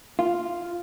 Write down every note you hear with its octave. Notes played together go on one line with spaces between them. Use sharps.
F4